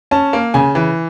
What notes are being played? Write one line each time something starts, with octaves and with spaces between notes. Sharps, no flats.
C#4 A5
A#3
C#3 G#5
E3